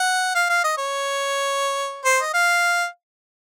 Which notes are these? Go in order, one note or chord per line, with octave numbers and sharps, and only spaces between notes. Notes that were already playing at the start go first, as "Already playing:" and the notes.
Already playing: F#5
F5
F5
D#5
C#5
C5
D#5
F5